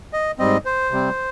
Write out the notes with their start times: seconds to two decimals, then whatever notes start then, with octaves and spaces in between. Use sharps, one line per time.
0.13 D#5
0.38 G#2 G3 C4 D#5
0.65 C5
0.91 C3 G3 C4